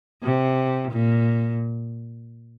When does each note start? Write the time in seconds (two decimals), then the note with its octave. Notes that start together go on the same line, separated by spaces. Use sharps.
0.23 C3
0.91 A#2